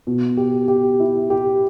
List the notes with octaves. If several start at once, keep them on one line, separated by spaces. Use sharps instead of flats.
B2
G4
G4
E4
G4